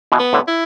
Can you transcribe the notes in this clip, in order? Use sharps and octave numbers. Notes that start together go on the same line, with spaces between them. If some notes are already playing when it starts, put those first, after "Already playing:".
B2 E3
B3
A2 D3
E4